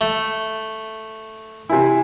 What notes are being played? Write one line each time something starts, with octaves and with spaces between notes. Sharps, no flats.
A3
C3 E4 G#5